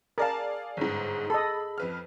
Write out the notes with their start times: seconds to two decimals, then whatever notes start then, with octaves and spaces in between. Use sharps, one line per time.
0.18 G#4 A#4 D5 F5 A5
0.77 G1 G#2 G#4
1.30 A4 D#5 B5
1.78 F2 B4 F6